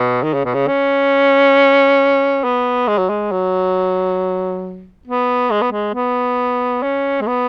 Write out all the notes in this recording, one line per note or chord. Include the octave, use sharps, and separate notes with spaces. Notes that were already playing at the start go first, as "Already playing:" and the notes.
Already playing: B2
D#3
C#3
B2
C#3
C#4
B3
G#3
F#3
G#3
F#3
B3
G#3
B3
G#3
B3
C#4
G#3
B3